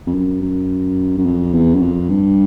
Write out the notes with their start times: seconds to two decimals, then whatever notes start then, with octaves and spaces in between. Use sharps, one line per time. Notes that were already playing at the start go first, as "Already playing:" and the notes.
0.07 F2
0.14 F#2
0.42 F#2
1.18 F#2
1.26 F2
1.54 E2
1.75 F#2
1.82 F2
2.10 G2